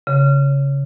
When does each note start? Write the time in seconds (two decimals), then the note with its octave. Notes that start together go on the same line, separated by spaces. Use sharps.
0.07 C#3